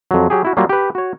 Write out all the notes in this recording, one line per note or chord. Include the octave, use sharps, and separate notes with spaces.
F2 F#3
F#3 G4 G#4
E4 F#4
F#3 G3 A#3 F4
G4 B4
F#4 C#5